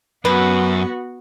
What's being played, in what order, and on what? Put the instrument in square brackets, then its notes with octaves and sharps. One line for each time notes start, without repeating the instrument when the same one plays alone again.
[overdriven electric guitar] F#2 [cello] B3 F#4 [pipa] B4